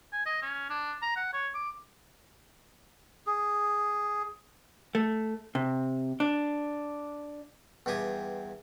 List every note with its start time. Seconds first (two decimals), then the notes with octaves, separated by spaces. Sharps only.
0.12 G#5
0.26 D#5
0.42 C#4
0.70 D4
1.02 A#5
1.16 F#5
1.33 C#5
1.54 D6
3.27 G#4
4.95 A3
5.55 C3
6.20 D4
7.86 E2 G2 G4 G#5 D#6